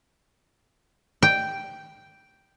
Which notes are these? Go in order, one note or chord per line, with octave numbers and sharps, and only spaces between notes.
G5